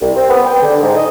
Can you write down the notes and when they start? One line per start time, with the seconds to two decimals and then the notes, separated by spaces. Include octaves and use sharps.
0.01 C2
0.16 C4
0.29 B3
0.45 G5
0.62 D3
0.82 G#2
0.96 D#5